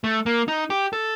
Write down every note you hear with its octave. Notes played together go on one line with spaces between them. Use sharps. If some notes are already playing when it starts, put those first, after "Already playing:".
A3
A#3
D#4
G4
A4